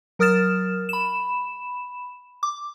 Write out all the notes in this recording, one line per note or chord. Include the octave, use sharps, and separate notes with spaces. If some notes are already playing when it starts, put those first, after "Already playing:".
F#3 A#4 D#6 F6 A6 E7
B5 E7
D6